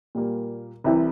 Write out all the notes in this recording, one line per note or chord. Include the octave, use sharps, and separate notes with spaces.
A#2 G3 A#3
C2 C3 E3 G3